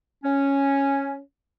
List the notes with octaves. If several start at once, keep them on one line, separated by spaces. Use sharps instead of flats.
C#4